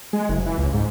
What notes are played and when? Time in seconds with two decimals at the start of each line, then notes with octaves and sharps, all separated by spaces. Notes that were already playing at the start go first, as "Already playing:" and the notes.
0.13 G#3
0.29 F#1
0.46 E3
0.58 C#2
0.73 G#2